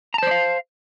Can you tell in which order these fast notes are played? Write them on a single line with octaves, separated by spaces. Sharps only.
A#5 A5 C5 D5 F5